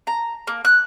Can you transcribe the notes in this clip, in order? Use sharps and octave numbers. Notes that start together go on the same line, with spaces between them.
A#5
A#3
F#6